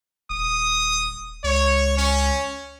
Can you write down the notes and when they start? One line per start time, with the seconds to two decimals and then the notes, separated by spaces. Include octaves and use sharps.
0.30 D#1 D#6
1.44 C#2 C#5
1.97 C#4